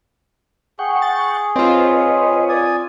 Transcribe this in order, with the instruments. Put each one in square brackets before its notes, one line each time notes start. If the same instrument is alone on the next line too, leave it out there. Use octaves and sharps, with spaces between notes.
[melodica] G#4 [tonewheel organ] F#5 G5 C#6
[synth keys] A6
[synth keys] C4 F4 [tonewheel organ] B4 C#5 D#5
[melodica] D5 G#5 D#6